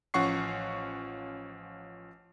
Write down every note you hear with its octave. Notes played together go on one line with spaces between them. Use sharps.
A1 F3 C#4 F#5 C#6 C7